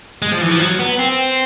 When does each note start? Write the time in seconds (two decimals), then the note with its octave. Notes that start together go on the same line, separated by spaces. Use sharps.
0.22 G#3
0.32 F3
0.42 E3
0.51 F3
0.61 F#3
0.80 B3
0.99 C4